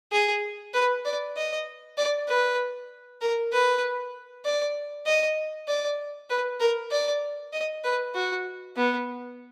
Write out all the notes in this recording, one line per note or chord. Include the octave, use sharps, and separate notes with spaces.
G#4
B4
D5
D#5
D5
B4
A#4
B4
D5
D#5
D5
B4
A#4
D5
D#5
B4
F#4
B3